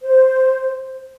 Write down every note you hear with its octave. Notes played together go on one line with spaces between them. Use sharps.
C5